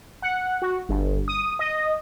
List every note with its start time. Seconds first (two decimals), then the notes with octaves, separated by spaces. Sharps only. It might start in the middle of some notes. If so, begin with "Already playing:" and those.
0.22 F#5
0.62 F#4
0.89 G1
1.28 D#6
1.59 D#5